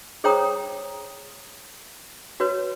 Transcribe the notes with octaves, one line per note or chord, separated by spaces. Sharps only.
G#4 C5 C#5 G5 A#5 D#6
F#4 B4 C#5